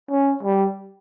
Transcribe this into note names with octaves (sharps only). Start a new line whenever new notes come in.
C#4
G3